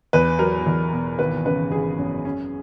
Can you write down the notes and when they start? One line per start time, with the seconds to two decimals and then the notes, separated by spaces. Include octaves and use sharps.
0.13 E2 B4
0.39 F#3 A#4
0.66 E2
0.93 B2
1.19 G#1 B4
1.45 C#3 B4
1.71 G#1 G#4
1.98 F#2
2.25 C#4